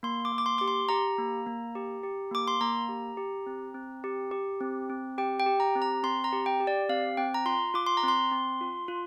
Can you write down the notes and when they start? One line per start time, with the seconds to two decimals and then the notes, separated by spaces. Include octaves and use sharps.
0.03 A#3 C6
0.25 D6
0.32 A#3
0.38 D6
0.46 C6
0.58 G4 D6
0.68 C6
0.89 G4 A#5
1.18 A#3
1.46 A#3
1.75 G4
2.03 G4
2.31 A#3 D6
2.48 C6
2.61 A#3 A#5
2.89 G4
3.17 G4
3.46 C4
3.74 C4
4.04 G4
4.31 G4
4.61 C4
4.89 C4
5.18 G4 G5
5.40 G5
5.46 G4
5.60 A#5
5.75 C4
5.82 A#5
6.03 C4 C6
6.24 A#5
6.32 G4
6.46 G5
6.60 G4
6.67 D5
6.89 C4 F5
7.17 C4 G5
7.34 A#5
7.45 F4 C6
7.74 F4 D6
7.86 C6
7.97 A#5
8.03 C4
8.08 C6
8.32 C4
8.61 F4
8.88 F4